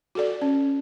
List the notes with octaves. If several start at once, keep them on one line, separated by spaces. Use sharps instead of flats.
F#4 A4 D5
C#4